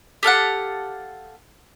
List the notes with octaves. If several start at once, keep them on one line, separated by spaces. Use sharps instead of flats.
G4 A4 F5 F#5